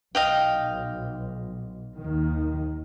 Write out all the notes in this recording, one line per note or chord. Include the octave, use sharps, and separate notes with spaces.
B1 D#5 F5 G5
D#2 D#3